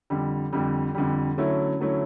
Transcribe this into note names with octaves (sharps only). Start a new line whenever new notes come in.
F2 D3 G3
F2 D3 G3
F2 D3 G3
D3 F#3 A3 C#4 E4
D3 F#3 A3 C#4 E4